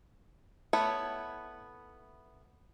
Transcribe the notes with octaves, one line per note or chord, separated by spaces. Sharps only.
A3 B3 E4 C#5